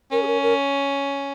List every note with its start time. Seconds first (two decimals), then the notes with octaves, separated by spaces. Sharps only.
0.12 C#4 A#4
0.22 G#4
0.27 A#4
0.42 A#4